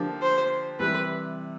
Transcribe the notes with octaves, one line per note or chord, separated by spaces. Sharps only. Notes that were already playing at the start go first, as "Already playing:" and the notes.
Already playing: D3 F3 A#3 D4 G4
C5
C3 E3 G3 B4